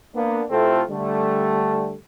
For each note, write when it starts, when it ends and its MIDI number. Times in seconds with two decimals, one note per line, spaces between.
0.15 0.42 58
0.15 0.42 59
0.15 0.42 62
0.50 0.81 48
0.50 0.81 57
0.50 0.81 60
0.50 0.81 64
0.50 0.81 65
0.50 0.81 69
0.89 1.94 50
0.89 1.94 55
0.89 1.94 57